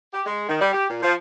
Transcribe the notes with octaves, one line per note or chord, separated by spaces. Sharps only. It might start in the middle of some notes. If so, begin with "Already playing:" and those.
G4
G#3
D#3
G3
G4
A#2
F3